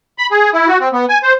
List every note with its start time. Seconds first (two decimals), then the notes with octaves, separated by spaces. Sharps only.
0.18 B5
0.31 G#4
0.53 E4
0.68 F#4
0.80 C4
0.93 B3
1.09 G#5
1.23 C5